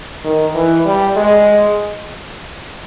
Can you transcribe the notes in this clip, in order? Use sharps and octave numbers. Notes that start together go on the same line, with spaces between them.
D#3
E3
G3
G#3